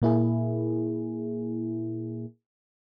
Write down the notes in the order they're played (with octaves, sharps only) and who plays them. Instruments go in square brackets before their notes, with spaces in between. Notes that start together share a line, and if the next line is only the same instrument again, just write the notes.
[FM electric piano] A#2 A#3 E4 G#4